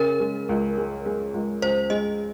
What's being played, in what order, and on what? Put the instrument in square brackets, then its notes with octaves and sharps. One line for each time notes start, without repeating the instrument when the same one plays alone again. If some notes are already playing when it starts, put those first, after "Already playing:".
Already playing: [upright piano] C#3 [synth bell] A#4
[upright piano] G#3
C#2
G#3
G#3
C#2
[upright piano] C#2 [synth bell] C5
[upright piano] G#3 [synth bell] D#5